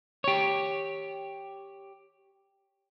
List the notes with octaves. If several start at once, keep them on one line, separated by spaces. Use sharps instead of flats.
G4 C#5